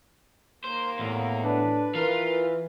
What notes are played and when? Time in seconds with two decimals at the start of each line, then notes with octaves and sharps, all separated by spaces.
0.64 D#2 A#3 C5
0.99 E2 A2
1.44 D4 B4
1.95 E3 F4 A#4 F5